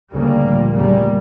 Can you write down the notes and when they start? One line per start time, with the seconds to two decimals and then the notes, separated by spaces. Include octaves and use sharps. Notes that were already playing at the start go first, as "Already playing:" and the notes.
0.13 D2 C#3 G3 A#3
0.43 A#1 A#2
0.74 F1 F2 C#3 G3 A#3